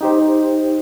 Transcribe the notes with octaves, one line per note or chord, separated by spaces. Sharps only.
D#4 G4 C5